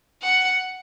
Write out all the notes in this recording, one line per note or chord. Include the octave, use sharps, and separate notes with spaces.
F#5